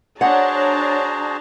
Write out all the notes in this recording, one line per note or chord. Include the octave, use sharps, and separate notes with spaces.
D4 F#4 G#4 C5 C#5 F#5 A5 A#5